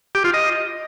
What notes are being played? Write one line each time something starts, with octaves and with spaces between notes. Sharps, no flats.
G4
F4
D#5